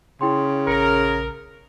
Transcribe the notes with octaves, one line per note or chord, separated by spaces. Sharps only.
C#3 E4 G5 C6
A#1 A#4 C#7